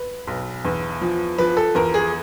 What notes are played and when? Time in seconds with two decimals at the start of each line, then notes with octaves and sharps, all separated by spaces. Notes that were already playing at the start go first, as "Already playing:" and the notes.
Already playing: B4
0.27 B1
0.64 E2
1.01 F3
1.38 F3 B4
1.57 A4
1.75 E2 A#4
1.94 G#4